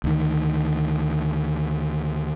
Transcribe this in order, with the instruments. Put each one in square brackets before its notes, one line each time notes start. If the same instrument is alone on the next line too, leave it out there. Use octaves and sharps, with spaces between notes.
[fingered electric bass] D2 D#3